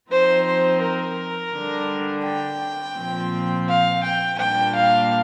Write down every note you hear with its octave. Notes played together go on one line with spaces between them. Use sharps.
F3 C4 D#4 C5
C5
A#4
D3 G3 D4
G5
A#2 F3 C4
F5
G5
A#2 G3 A#3 D4 G5
F5